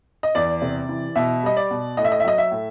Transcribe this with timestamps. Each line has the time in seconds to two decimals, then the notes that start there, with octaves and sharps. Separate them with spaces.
0.23 D#5
0.35 E2 D5
0.62 C3
0.89 E3
1.16 B2 E5
1.43 G3 D#5
1.57 D5
1.71 B2
1.97 A2 D#5
2.05 E5
2.12 D#5
2.20 E5
2.25 F#3 D#5
2.38 E5
2.51 A2